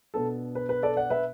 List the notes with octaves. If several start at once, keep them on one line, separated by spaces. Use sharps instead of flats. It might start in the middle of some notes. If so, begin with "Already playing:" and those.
B2 B3 D4 A4
B4
B4
A4 D5
D5 F#5
B4 E5